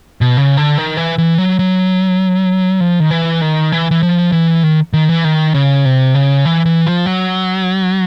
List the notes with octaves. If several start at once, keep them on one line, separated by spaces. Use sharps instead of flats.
B2
C#3
D3
D#3
E3
E3
F#3
F#3
F3
D#3
E3
D#3
E3
E3
F3
E3
D#3
D#3
E3
D#3
C#3
C3
C#3
E3
E3
F3
F#3